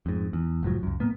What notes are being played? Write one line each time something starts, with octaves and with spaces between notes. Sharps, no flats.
F2 G#2
E2
F1 G#2 F3 F#3
C#2 F#2
A2 A#3 B3